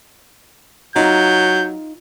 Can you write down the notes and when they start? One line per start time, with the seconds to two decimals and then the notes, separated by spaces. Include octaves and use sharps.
0.96 F#3 D#4 F4 G6